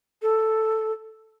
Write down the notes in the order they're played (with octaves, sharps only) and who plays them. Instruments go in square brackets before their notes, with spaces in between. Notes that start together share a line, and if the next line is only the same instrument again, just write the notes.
[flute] A4